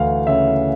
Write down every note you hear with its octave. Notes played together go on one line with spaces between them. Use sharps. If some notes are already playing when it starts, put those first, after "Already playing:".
Already playing: D2 E3 F5
C#3 E5